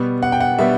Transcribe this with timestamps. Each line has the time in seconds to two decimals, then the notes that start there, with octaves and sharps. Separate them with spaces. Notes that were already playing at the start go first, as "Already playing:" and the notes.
Already playing: B2 G3 B3
0.23 F#5
0.32 G5
0.40 F#5
0.58 B2 G3 B3 E5